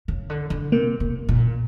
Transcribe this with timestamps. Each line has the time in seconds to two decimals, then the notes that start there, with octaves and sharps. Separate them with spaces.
0.08 C#3
0.30 D3
0.50 D3
0.72 C3 A#3
1.00 C3
1.29 A#2